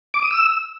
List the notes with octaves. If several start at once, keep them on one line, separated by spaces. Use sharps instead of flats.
D6
D#6
E6